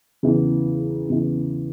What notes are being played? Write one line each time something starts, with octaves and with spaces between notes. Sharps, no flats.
E2 C#3 E3
E2 C#3 E3